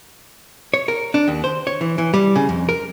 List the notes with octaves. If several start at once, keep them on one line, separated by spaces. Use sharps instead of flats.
C#5
A#4
D4
D#2
C5
C#5
E3
E3
G3
C#3
F2
A#4